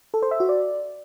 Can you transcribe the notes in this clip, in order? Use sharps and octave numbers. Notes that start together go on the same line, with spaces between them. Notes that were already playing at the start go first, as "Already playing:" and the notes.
A4
C5
E5
F#4
D5